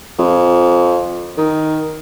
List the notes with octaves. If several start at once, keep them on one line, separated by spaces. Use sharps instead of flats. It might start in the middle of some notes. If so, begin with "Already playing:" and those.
F2
D#3